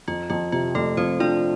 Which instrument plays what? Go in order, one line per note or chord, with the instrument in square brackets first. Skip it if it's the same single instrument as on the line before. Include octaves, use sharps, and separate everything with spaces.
[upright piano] F2 [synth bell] F4
[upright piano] F2 [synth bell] F4
[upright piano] C3 [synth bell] F4
[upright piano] F2 [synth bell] A3 A4
[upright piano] F2 [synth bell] C4 C5
[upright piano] F3 [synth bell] D4 D5